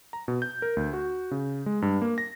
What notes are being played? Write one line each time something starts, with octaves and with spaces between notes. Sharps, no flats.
A#5
B2
G6
A#4
D2
F#4
C#3
G#3
G2
A#3
A#6